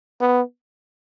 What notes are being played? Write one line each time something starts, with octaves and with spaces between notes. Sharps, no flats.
B3